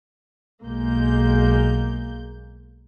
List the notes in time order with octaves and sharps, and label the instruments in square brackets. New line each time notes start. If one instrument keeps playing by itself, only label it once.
[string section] B1 G#3 A#3 G6